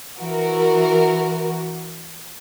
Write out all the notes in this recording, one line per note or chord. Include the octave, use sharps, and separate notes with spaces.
E3 F#4 A#4